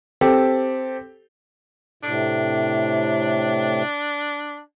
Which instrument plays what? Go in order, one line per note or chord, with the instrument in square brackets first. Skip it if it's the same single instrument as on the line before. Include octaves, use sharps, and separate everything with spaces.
[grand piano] C4 G4 A4
[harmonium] A2 C3 [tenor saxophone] D4